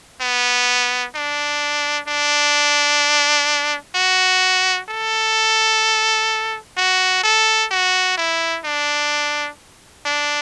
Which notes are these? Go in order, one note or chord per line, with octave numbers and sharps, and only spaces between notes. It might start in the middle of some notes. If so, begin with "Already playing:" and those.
B3
D4
D4
F#4
A4
F#4
A4
F#4
E4
D4
D4